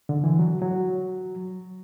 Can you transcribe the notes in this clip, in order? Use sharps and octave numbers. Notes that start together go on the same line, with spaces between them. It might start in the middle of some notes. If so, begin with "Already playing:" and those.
D3
E3
F#3
F#3